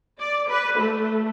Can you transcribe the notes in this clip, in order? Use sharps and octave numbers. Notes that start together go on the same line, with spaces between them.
D5
B4
A3